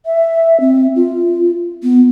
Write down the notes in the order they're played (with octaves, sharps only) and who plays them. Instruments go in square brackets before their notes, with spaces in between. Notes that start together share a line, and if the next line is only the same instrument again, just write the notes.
[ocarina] E5
C4
F4
B3